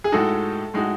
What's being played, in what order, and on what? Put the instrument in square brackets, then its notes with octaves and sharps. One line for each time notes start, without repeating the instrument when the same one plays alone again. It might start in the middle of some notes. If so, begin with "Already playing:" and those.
[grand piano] G#4
[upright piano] A2 G#3 D#4 F#4 [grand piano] A4
[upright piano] A2 G#3 D#4 F#4